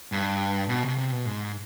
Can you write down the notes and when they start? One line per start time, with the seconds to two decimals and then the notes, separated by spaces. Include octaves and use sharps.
0.12 G2
0.69 B2
0.83 C3
0.98 C3
1.12 B2
1.26 G#2